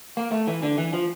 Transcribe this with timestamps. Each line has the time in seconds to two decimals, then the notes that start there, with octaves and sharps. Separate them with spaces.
0.17 A#3
0.32 A3
0.47 E3
0.63 D3
0.78 E3
0.93 F3